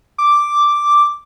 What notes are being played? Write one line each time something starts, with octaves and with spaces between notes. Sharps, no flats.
D6